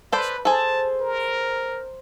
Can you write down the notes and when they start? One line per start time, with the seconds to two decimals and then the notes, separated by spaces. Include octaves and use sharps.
0.12 A4 B4 C5 D5
0.45 G#4 A4 C5 A5
1.00 A#4